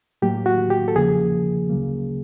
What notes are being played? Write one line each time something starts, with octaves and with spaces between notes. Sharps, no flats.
A2 F#3 A#3 G4
F#4
G4
A4
E2 C#3 F3 A#3 G#4
D2 C#3 F#3 A#3